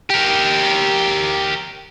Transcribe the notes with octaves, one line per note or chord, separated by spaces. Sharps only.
G4 A#4